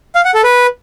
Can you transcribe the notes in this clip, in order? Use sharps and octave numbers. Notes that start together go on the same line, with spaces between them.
F5
F#5
A4
B4